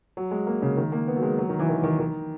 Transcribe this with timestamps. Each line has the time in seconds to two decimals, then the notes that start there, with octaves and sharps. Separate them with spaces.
0.17 F#3
0.31 G#3
0.47 A#3
0.62 C#3
0.77 D#3
0.92 A#3
1.08 B3
1.16 F#3
1.23 G#3
1.38 F#3
1.49 D#3
1.59 E3
1.69 D#3
1.84 D#3
1.99 D#3